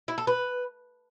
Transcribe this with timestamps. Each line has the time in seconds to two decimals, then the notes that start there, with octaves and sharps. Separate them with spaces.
0.08 E4
0.18 A4
0.27 B4